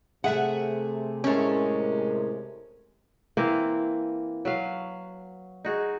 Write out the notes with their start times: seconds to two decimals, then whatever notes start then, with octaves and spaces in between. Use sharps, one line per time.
0.24 C3 A3 G#4 E5 F#5
1.24 A2 C3 G#3 C#4 A#4
3.37 E3 A#3 C4
4.45 F#3 B4 F5
5.65 D#4 F#4 G#4